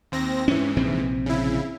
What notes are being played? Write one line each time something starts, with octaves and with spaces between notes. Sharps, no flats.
D#2 C4 A#6
G#2 E3 C#4
A#1 C3 C4
C#3 E4